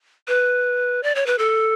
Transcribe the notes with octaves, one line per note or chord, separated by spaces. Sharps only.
B4
D5
C#5
B4
A4